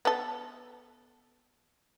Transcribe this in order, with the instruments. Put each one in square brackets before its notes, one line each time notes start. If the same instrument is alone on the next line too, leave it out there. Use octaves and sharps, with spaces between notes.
[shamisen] B3 A4